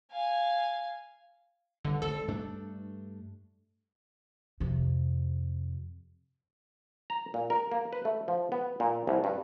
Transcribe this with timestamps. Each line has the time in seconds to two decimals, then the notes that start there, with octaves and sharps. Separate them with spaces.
0.11 F5 G#5
1.85 G1 D3
2.02 G#1 A4
2.28 G2 A3 D4
4.60 F2 C3
7.10 A#5
7.34 A#2
7.50 A#4
7.71 A#3
7.93 B4
8.05 A3
8.28 F3
8.52 B3
8.80 A#2
9.07 C2
9.24 G2